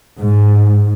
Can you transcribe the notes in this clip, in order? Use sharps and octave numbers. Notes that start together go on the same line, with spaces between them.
G#2